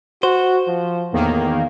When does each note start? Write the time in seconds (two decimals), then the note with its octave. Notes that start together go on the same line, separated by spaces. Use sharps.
0.23 F#4 C5
0.67 F3
1.13 E2 A2 D#3 A#3